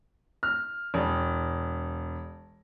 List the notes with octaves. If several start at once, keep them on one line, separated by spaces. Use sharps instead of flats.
F6
E1